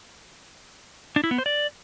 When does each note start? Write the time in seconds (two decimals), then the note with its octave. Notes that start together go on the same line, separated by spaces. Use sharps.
1.16 D4
1.24 E4
1.31 B3
1.38 C5
1.46 D5